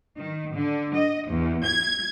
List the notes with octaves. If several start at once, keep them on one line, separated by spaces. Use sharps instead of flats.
D#3
D3
D#5
E2
G#6